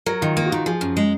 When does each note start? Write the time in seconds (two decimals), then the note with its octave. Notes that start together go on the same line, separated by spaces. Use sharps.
0.06 F#3 A#4
0.21 D#3 F4
0.36 A#3 D#4
0.46 F#4
0.52 D#3 F4
0.66 F3 G#4
0.81 F#2
0.97 G#3